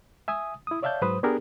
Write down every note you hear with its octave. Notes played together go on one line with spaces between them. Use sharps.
E5 G#5 D#6
E4 D#6
C#5 D5 E5 F5 A5 G6
G#2 F#3 B4 C5 D#6
B3 D4 G4 G#4 A#4